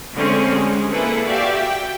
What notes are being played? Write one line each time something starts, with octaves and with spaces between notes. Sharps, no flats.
D3 G#3 A3 C4 C#4
G3 G#3
A#3 E4 G#4 A4 B4
F#4 G4 D5 E5 F5
G5